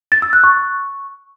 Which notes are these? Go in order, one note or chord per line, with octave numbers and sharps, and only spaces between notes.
A6
E6
F#6
C#6